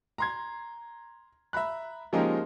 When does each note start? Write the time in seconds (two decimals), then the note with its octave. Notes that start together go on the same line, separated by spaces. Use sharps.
0.18 A#5 C6 G#6
1.53 E5 A#5 B5 F#6
2.13 F3 G#3 A#3 C#4 D#4 G4